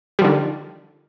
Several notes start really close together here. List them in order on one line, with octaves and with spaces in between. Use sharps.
G3 F3 D3 D#3